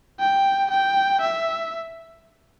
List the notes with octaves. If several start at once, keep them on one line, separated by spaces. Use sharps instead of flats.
G5
G5
E5